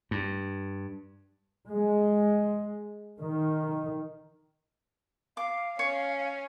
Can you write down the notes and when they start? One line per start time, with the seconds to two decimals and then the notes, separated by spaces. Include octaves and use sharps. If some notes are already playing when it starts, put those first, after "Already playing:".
0.11 G2
1.70 G#3
3.20 D#3
5.37 F5 D6
5.79 C#4 C#5